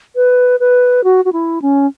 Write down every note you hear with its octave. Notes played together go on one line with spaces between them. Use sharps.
B4
B4
F#4
F#4
E4
C#4